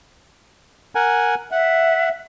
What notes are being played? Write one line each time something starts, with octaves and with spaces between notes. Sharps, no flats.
A#4 F#5 G#5
E5 F#5